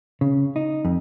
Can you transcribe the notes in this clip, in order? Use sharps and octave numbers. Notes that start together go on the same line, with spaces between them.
C#3
D#4
F2